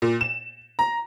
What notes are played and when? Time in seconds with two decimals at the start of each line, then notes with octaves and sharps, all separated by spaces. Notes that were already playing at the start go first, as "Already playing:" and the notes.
0.02 A#2
0.21 E7
0.79 A#5